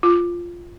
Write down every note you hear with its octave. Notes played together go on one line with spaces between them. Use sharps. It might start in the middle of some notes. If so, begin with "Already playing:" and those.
F4